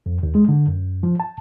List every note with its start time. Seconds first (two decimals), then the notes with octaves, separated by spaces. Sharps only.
0.06 F2
0.23 D#2
0.35 G#3
0.49 D3
0.68 F#2
1.03 F3
1.20 A5